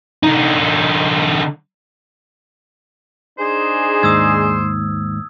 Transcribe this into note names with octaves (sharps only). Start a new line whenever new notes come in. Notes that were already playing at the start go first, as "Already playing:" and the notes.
D3 D#4
D4 D#4 G#4 C5
D#2 G#2 D#6 E6 G#6